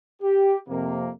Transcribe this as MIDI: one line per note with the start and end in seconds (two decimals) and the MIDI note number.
0.22 0.56 67
0.68 1.11 41
0.68 1.11 48
0.68 1.11 53
0.68 1.11 58